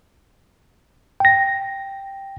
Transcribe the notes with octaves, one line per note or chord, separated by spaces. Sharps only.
G5 A#6